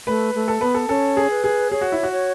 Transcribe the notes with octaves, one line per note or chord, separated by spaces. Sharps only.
A3 B4
A3
A4
B3 B4
A4
C#4 A4
G#4
B4
G#4
G#4 C#5
F#4
E4
F#4
C#5